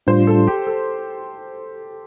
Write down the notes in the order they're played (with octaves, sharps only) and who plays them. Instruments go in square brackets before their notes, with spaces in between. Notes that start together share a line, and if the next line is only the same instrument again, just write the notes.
[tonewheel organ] A2 G3 D4 F4 [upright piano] C5
[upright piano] A4
G4
A4